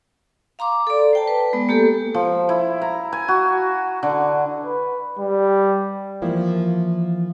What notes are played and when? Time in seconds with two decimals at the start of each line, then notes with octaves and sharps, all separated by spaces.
0.59 F5 A#5 C6 D6
0.87 A4 D5
1.13 C5 G5 A5
1.28 B4
1.53 G#3 B3
1.69 A#3 G4 A4
2.14 F3
2.49 E4
2.82 A#5
3.13 G#5
3.28 F#4
4.03 D3
4.65 B4
5.19 G3
6.22 E3 F3 A#3 E4